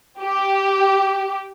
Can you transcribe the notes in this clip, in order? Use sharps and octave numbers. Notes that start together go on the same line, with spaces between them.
G4